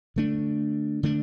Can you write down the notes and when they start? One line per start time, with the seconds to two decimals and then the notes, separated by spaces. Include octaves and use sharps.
0.16 D3 A3 D4
1.03 D3 A3 D4